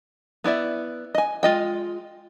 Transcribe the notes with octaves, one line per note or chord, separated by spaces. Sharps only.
B3 E4 D5 E5
D#5 G#5
G#3 F4 D#5 G5